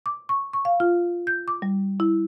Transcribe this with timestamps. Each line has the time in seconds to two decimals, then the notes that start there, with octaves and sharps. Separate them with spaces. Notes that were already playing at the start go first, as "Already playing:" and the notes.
0.06 D6
0.29 C#6
0.53 C#6
0.65 F5
0.80 F4
1.27 G6
1.48 D6
1.62 G3
2.00 E4